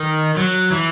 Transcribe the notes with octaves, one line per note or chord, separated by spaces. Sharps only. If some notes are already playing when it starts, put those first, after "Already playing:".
Already playing: D#3
F#3
E3